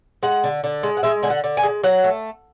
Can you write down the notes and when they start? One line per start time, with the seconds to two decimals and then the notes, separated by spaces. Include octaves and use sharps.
0.23 G#3 F#5
0.44 D3
0.64 D3
0.83 G#3
0.97 F#5
1.03 G#3 E5
1.23 D3 G#5
1.30 F#5
1.44 D3
1.57 G#5
1.63 G#3
1.83 F#3 F#5
2.04 A3